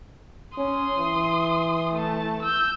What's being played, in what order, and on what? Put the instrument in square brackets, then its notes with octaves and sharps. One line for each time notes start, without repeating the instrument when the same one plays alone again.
[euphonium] C#4 [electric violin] C6 D#6
[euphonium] E3
[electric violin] A3 A5
E6 G6